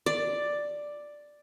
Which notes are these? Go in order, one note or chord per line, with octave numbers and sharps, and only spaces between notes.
D5